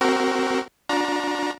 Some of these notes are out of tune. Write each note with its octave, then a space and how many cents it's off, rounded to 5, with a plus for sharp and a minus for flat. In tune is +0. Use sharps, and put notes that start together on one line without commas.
C4 +0 F#4 +25 A#4 -10
D4 +0 F#4 -45 A#5 +25